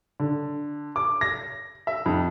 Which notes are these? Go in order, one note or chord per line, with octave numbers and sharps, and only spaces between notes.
D3
D6
A#6
E5
F2